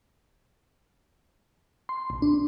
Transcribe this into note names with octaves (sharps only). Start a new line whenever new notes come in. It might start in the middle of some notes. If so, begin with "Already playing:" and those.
C6
A#1
D4